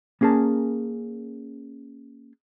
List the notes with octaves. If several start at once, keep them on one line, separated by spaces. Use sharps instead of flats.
A#3 C#4 G#4 A#4 A5